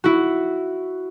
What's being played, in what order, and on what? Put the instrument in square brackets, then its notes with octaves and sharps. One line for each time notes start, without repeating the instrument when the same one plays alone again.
[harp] E4 F#4